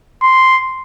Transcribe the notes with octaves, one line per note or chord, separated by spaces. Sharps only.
C6